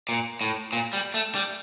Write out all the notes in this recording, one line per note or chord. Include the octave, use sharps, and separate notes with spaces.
A#2
A2
A#2
G3
A3
G3